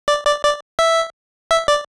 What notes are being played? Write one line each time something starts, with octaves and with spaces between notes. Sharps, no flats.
D5
D5
D5
E5
E5
D5